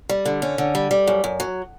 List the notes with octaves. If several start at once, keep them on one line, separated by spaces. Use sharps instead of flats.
G3
D3
C#4
D3
G3
G3
F#2
F#2
F#3